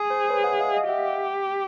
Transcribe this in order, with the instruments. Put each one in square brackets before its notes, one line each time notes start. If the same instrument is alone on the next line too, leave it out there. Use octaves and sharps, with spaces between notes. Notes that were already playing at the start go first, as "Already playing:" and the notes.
Already playing: [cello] G#4
[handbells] C5
B4 C#5
E5 F#5
D#5 F5
D#5 F5
[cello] G4 [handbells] E5 F#5